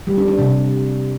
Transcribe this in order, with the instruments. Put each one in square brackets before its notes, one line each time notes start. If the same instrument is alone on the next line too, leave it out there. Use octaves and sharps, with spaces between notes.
[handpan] G3
D4
D4
C3